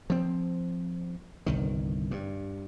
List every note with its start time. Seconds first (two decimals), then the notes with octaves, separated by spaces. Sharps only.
0.10 F3 C4
1.46 G1 C2 D#3
2.11 G2